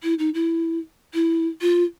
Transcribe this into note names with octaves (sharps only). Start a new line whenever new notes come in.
E4
D#4
E4
E4
F4